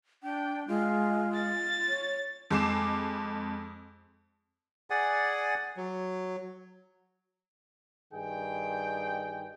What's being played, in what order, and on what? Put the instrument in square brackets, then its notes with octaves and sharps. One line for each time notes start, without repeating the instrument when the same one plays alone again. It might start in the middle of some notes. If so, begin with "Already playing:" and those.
[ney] D4 [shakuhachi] G5
[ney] G#3 [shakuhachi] F4
[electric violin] A6
[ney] C#5
[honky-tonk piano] F2 G#3 D6 C7 E7
[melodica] G#4 D5 F#5 G#5
F#3
[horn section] G2 D#3 G#4 G5